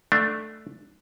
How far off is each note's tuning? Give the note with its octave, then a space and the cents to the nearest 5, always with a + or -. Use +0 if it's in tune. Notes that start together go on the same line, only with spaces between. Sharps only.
A3 +0 D4 +10